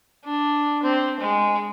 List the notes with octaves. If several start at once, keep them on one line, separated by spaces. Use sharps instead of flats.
D4
C4
G#3